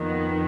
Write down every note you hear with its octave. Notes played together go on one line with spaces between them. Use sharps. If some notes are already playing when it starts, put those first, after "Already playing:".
Already playing: F2 D#3 B3